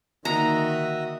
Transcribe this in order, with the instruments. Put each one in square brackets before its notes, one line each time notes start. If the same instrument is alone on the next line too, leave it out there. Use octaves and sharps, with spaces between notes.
[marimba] D3 A#3 [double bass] D#3 [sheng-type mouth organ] F#4 D#5 E5 [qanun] A#5